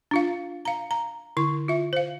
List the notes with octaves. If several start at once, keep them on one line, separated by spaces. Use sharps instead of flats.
D4 F4 F5
F5 A#5
A#5
D3 E4 C#6
F4 E5
C5 F5